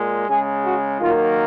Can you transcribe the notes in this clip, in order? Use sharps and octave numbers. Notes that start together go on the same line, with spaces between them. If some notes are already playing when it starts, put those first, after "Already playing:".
Already playing: A#2 G#3
C#3 G#3 G#4
F#4
D#3 F#3 A#3 F4